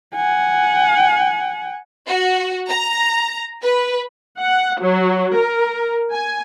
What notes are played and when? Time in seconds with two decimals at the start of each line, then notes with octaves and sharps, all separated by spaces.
0.15 F#5 G#5
2.06 F#4
2.68 A#5
3.62 B4
4.39 F#5
4.80 F#3
5.35 A#4
6.10 G#5